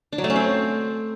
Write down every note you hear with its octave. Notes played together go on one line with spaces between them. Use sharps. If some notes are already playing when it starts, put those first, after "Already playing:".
D4
F#3
A3
C#4
C4